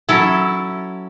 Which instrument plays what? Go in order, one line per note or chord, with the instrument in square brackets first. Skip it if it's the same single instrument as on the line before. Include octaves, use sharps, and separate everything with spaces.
[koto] F#3 C#4 E4 A4